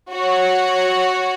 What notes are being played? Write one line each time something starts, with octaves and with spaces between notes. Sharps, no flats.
F#4 C#5 F#5